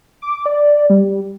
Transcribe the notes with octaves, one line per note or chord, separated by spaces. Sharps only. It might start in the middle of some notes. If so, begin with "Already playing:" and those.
D6
D5
G3